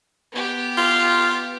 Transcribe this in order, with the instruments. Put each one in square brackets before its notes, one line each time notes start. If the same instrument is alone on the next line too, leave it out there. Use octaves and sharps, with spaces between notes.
[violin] B3 G4
[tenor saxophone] F4